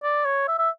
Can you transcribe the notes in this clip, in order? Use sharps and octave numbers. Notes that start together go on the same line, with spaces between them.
D5
C#5
E5
E5